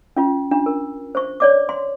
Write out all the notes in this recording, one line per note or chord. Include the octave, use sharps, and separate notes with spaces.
C#4 F4
D4 F4
A#4
C5 C#6
C#5 D5 D6
C6